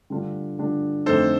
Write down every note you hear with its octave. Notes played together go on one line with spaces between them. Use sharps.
D3 G3 D4 F4
D3 G3 D4 F4
F2 D3 A3 D#4 A4 C5